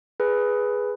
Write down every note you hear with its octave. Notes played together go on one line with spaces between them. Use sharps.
G#4 B4